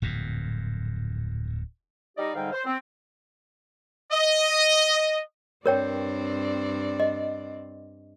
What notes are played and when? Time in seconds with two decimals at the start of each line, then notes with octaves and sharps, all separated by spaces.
0.02 D1 F2 A#2
2.18 G3 D#4 G4 D5 D#5
2.34 G#2 D3 G3 D#4 F5 G5
2.52 C5
2.65 C4
4.12 D#5
5.66 G2 C4 A#4 C#5 D5 G5
7.00 D#5